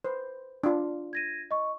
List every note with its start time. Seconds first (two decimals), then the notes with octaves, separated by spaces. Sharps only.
0.04 B4 C5
0.64 D4 F4
1.13 G#6 A#6 D#7
1.51 D#5 C#6